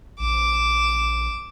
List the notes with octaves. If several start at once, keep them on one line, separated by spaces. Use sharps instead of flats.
A#1 D6 E7